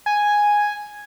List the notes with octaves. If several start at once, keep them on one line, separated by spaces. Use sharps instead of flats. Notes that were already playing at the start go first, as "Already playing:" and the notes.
G#5